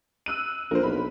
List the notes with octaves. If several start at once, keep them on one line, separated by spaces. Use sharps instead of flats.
E6 F#6 D#7
A#1 A#4 C5
B1 B5